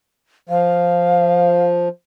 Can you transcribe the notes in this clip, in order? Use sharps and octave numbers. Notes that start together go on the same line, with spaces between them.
F3 F5